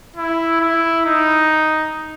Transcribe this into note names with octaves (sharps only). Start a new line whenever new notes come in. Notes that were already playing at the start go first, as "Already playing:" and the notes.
E4
E4
D#4